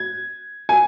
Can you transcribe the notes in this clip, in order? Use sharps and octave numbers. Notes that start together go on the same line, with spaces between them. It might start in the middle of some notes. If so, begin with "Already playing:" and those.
Already playing: G#6
G#5